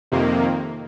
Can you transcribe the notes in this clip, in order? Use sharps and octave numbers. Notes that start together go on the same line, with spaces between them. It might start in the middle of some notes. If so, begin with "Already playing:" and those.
F2 C3 D#3 A#3